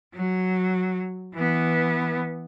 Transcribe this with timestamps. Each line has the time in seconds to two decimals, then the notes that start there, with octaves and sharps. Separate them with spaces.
0.15 F#3
1.35 E3 B3